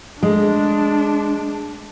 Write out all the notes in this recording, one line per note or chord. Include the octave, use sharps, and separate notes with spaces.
G#3 D4